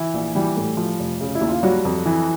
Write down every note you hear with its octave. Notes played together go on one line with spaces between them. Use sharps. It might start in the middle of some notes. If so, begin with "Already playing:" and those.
Already playing: E3 E4
A#1
E3 G3 G4
A2
F3
F1
C#3
E4
D#2
F4
F#3 G3 F#4
F2
E3